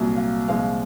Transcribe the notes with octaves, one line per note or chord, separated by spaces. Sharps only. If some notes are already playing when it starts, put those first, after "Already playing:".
Already playing: C2 A#2 F#3
F5
C2 A#2 F3 G#3 F5